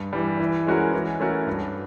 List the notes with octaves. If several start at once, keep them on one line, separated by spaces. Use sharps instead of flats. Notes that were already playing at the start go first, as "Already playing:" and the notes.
Already playing: G2
E3 G3
E3
G#3 C#4 F#4 A#4
E3
A3 C#4 F#4 A#4
G2